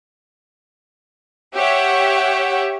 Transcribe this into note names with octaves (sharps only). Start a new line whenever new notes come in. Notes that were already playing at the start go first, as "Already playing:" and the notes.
G4 C#5 E5 F#5